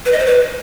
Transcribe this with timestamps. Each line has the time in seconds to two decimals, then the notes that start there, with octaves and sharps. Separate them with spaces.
0.06 B4
0.12 D#5
0.19 C5
0.26 B4